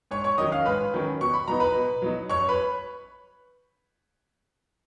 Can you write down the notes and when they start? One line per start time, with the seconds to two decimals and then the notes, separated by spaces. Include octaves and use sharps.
0.11 G#2 C#5 C#6
0.24 C#5 C#6
0.38 D#3 F#3 C#4 D#5 D#6
0.52 F5 F6
0.66 G#2 B4 B5
0.94 D#3 F#3 C#4
1.21 B2 C#6
1.34 B5
1.48 F#3 B3 D#4 A#5
1.60 B4 B5
1.75 B2
2.02 F#3 B3 D#4
2.30 F#2 C#5 C#6
2.49 B4 B5